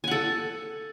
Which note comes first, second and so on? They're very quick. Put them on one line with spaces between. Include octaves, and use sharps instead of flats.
G#5 F#5 A4